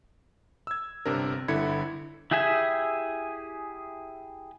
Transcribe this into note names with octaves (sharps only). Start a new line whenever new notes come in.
E6 G#6
G1 C3 D4 A#4
G1 D3 E4 B5 G#6 C#7
E4 G4 G#4 E5 G#5